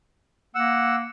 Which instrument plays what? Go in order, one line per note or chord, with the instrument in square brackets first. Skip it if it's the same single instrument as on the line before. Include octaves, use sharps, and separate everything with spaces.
[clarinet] A#3 [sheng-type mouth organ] F#5 E6